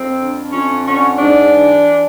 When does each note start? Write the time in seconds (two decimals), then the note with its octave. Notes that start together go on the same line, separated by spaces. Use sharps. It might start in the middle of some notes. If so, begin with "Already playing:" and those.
Already playing: F2 C4
0.19 D3
0.52 F2 C#4
0.86 D3 C#4
1.19 G#2 D4
1.52 E3